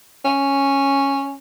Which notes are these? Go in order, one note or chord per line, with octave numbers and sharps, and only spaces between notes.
C#4